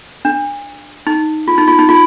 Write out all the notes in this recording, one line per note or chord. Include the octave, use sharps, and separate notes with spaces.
D4
D#4
F4
D#4
F4
D#4
F4